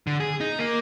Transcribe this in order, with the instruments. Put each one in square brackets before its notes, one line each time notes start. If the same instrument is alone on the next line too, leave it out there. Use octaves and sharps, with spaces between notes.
[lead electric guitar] D3
G#4
D#4
A#3